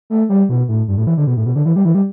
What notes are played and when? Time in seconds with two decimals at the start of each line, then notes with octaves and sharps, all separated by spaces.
0.10 A3
0.29 G3
0.49 B2
0.69 A2
0.88 G2
0.98 A2
1.07 E3
1.17 D3
1.27 B2
1.37 A2
1.46 B2
1.56 D3
1.66 E3
1.76 G3
1.85 E3
1.95 G3